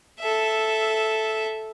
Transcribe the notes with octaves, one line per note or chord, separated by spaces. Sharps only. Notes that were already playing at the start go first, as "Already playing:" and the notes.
A4 E5